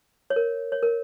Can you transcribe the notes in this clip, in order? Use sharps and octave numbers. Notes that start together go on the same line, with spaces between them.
C#5
A#4
C#5
A#4